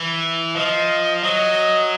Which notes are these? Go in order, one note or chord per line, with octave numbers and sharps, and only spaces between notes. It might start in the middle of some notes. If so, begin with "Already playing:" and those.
Already playing: E3
F3 D#5
F#3 D#5